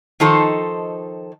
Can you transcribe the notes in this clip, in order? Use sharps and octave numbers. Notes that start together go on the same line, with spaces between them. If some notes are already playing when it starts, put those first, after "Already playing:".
D#3 F3 D#4 A4 C5